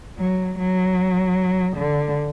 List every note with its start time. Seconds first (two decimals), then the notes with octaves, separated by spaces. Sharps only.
0.19 F#3
0.59 F#3
1.77 D3